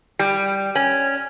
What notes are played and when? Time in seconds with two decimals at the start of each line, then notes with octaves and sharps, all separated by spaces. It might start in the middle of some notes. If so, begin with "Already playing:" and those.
0.19 G3
0.75 C#4